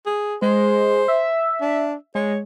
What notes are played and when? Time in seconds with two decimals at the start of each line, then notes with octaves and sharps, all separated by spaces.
0.06 G#4
0.42 G#3 C5
1.08 E5
1.61 D4
2.15 G#3 C#5